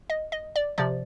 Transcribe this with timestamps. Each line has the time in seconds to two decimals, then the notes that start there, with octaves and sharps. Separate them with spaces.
0.10 D#5
0.32 D#5
0.56 D5
0.78 C3 F3 D5